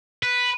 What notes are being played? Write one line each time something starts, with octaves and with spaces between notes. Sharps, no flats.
B4